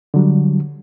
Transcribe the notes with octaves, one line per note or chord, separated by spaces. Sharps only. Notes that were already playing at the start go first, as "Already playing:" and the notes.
D3 F#3 G3